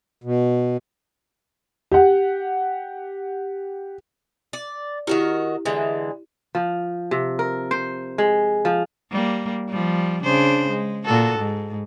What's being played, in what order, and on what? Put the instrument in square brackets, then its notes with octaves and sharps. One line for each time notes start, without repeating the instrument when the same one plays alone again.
[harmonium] B2
[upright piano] G4 F#5
[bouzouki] D5
[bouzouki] D#3 F#4 A#4 [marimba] E4 G4
[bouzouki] D3 E3 G#3
[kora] F3
C3
A#4
C5
G#3
F3
[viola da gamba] G3 A#3
F3 G3
C#3 D4 C5
G#3
A#2 F#4 A4
G#2